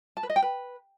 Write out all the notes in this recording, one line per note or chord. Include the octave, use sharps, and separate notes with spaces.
A5
B4
D#5
G5
B4